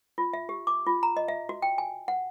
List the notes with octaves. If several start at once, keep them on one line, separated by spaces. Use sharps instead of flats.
F4
E5
G4
D6
F4
A#5
D#5
E5
F#4
G5
G#5
F#5